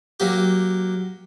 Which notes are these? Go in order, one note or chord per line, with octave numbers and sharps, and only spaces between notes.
F#3 A#3 G4